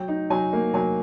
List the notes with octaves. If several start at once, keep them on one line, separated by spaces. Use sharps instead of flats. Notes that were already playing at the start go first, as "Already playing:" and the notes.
Already playing: F#3 G5
D#4
F#3 G#5
A#3
F#3 G#5